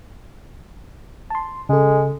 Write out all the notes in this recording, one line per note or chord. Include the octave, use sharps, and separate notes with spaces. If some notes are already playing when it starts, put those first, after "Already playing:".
A5 C6
C#3 G#3 A4